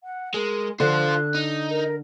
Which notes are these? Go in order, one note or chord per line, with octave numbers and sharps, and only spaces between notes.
F#5
G#3 A#4
D3 F4 C5 F#6
D#4
A#4